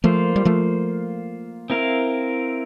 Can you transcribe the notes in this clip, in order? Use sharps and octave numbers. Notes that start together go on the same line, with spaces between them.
F3 A3 A#3 F4 C5
G3
F3 A3
C4 E4 A#4 F5